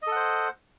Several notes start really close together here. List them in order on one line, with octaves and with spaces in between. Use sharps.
D#5 A4 F#5 C5